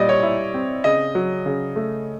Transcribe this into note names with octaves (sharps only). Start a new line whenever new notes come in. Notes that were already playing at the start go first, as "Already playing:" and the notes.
Already playing: A#2 G3 D5 D#5
C#5
E4
C4
C#3 D#5
F#3
C#3
A3